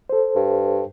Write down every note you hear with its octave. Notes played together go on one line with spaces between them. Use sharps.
A4 C5
G2